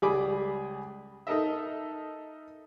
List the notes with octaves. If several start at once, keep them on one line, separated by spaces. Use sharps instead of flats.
C#2 G3 G#4 G#5 B5 D6
D#4 A4 A#4 D#5 E5